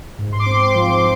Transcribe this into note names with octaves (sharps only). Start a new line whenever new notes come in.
G#2
C6
D6
C4
C6
D6
F3
D6